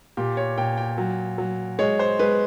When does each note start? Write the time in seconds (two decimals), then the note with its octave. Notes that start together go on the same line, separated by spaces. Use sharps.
0.17 A#2 G4
0.37 C#5
0.58 A#2 G5
0.77 G5
0.98 F#3
1.38 F#3
1.79 G#3 C#5
1.99 C5
2.19 G#3 B4